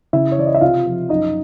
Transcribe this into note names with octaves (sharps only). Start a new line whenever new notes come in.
C#3 E4 E5
C#5
E3 D5
D#5
E5
C3 F4 F5
F3
F#2 D#4 D#5